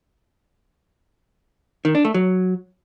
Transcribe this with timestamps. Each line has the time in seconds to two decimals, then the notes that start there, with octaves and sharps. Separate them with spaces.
1.85 D#3
1.95 D4
2.05 A3
2.14 F#3